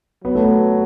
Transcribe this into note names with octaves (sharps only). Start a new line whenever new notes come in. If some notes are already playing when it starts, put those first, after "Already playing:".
F#3 B3
A3
B3